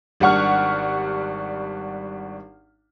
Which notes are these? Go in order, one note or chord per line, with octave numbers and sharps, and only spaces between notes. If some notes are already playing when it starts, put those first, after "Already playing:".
G#1 G3 D4 F#5 C#6 F6